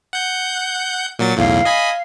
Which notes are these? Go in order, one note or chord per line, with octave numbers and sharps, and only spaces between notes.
F#5 G6
A#2 F#3 A6
B1 E2 A2 F5
D#5 G#5 B5